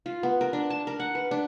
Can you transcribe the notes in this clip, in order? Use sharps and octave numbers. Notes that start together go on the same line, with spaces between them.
F4
B3
A#4
D4
A5
A#4
F#5
B4
D4